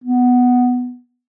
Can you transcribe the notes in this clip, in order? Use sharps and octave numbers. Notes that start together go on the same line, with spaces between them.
B3